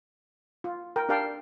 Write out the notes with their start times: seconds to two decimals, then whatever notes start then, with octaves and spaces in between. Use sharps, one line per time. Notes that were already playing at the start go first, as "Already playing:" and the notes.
0.64 F4
0.96 A#4 G5
1.09 D4 G4 A#4 F5 G5 A5